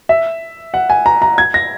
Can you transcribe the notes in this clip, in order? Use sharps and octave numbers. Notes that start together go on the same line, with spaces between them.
E5
F#5
G#5
A#5
A#5
G#6
A#6